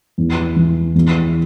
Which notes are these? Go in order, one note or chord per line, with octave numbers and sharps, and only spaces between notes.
E2
E3
E2